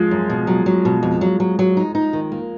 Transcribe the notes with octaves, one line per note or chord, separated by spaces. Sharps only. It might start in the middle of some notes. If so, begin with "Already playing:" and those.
Already playing: F3 G#3
F#2
B2
F#3
F#3
B2
F2
F#3
F#3
F#3
D#4
D#4
D#3
A#3